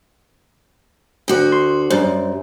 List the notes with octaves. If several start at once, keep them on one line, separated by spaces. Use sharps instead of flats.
D2 F#4
C6
F#2 G3 C5